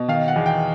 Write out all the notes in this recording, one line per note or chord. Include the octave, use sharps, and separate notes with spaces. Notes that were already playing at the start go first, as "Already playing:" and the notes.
Already playing: B2
D#3 F5
F#5
E2
G5